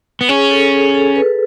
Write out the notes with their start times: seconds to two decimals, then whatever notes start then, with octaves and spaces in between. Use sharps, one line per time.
0.21 B3
0.29 C#4 G#4
0.51 A4
0.72 G#4
0.95 A4
1.16 B4